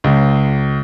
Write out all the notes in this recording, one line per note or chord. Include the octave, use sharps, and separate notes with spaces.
C#2